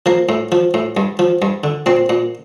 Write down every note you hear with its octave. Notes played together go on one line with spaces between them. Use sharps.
F3 A#3
A2
F3
A2
G2
F3
G2
D3
A#2 C4
A#2